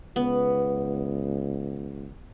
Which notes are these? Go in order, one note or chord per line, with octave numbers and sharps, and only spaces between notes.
C#2 B3